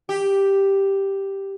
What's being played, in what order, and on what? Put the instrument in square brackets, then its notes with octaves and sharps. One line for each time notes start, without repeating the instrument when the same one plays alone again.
[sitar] G4